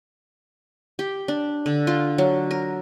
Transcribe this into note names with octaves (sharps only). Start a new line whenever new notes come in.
G4
D4
D3
F4
F#3
A#4